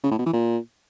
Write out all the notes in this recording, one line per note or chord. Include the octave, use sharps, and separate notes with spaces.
C#3
A2
B2
E3
A#2